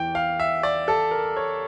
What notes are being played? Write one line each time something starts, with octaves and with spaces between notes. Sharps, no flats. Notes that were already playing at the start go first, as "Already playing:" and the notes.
Already playing: E2 E3 G5
F5
E5
D5
A4
A#4
C#5